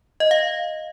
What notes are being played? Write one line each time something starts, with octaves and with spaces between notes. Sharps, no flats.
D#5
F5